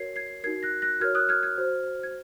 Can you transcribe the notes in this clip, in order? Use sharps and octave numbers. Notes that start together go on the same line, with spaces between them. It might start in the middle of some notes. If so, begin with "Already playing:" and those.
Already playing: F#4 A#4 C#5 G#6 C7
G#6 C7
D#4 F#4 A#4 G#6 C7
F#6 A#6
F#6 A#6
F#4 A#4 C#5 F6 G#6
D#6 F#6
F6 G#6
F6 G#6
F#4 C5
G#6